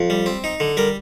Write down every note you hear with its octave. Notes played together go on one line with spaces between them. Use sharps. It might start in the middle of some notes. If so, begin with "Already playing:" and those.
Already playing: F2
G3
C4
D#4
D3
G3 A#4